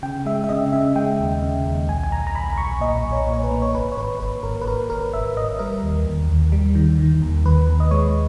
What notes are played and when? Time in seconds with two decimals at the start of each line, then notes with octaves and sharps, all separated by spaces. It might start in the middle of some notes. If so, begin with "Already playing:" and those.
0.03 C#3 G5
0.26 G#3 E5
0.44 E5
0.49 C#3 D#5
0.73 C#3 E5
0.95 G#3 G5
1.20 D#2
1.43 C#3
1.65 D#2
1.88 B1 G#5
2.03 G#5
2.12 B1 A#5
2.27 A#5
2.35 B1 B5
2.53 B5
2.58 B1 C#6
2.81 A#2 D#5
3.04 B1
3.12 C#5
3.27 A#2
3.33 C#5
3.43 B4
3.51 A#3
3.62 C#5
3.75 G#1 B4
3.92 C#5
3.97 G#1 B4
4.20 G#1 B4
4.43 G#1 A#4
4.61 B4
4.66 G#1 A#4
4.89 G#1 A#4
5.13 G#1 E5
5.37 G#1 D#5
5.59 G3 A#4
5.83 D#2
6.06 D#2
6.29 D#2
6.52 G3
6.75 D#3
6.99 D#3
7.22 D#2
7.45 D#2 B4
7.69 D#2
7.80 D#5
7.91 G#3 C#5